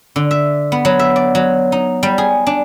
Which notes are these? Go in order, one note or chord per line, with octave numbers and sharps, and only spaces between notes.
D3
E5
B3
F#3
E5
D5
F#3
D#4
G3
G#4
D4